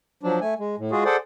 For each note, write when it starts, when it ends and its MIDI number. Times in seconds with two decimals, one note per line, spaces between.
0.23 0.40 53
0.23 0.40 54
0.23 0.40 62
0.41 0.54 57
0.41 0.54 80
0.59 0.76 56
0.78 0.91 45
0.91 1.04 56
0.91 1.04 65
0.91 1.04 66
0.91 1.04 68
1.05 1.16 68
1.05 1.16 69
1.05 1.16 72
1.05 1.16 74
1.05 1.16 78